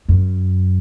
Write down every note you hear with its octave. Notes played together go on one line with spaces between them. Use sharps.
F#2